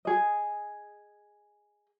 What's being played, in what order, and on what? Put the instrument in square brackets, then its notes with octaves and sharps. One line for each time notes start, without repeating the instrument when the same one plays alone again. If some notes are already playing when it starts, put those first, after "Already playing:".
[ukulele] G#4 D#5